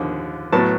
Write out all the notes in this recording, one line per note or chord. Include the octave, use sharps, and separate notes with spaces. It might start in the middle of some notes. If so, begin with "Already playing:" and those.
Already playing: D#2 D3 F3
A2 F#3 B3 A5